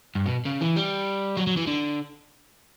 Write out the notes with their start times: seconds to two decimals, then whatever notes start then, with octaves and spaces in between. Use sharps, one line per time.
0.15 G2
0.26 B2
0.46 C#3
0.62 E3
0.76 G3
1.37 F#3
1.47 F#3
1.57 E3
1.67 D3